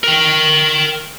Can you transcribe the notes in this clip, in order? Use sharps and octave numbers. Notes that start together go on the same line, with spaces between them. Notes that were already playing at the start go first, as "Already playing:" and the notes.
A#4 G5